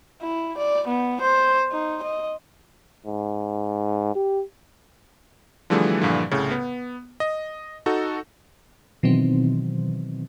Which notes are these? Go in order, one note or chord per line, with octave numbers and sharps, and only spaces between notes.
E4
D5
B3
C5
D#4
D#5
G#2
G4
D3 E3 F3 G3 A3 G#4
G2 A#2 D3 E3 F3
C2 A2 C#3
B3
D#5
D#4 F#4 A4
B2 D#3 E3 F#3 C4